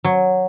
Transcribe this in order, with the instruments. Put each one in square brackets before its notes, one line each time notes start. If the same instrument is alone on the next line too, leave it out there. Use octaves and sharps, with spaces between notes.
[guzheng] F#3